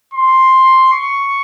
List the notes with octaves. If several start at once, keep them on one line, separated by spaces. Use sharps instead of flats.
C6
C#6